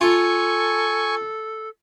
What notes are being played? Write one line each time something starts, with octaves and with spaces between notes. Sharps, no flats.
F4 A4 G#5 C#6